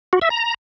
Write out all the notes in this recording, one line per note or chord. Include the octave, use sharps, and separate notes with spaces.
F#4
E5
A#5